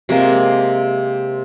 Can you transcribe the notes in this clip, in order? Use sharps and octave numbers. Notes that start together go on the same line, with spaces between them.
C3 G#3 A#3 G#5